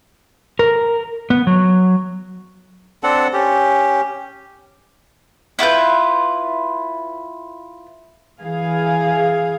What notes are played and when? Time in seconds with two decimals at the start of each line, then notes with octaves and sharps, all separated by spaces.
0.59 A#4
1.30 B3
1.47 F#3
3.03 C4 D4 A4 F#5
3.33 C#4 G4
5.59 E4 F4 B4 G6
8.40 E3 G#4 F5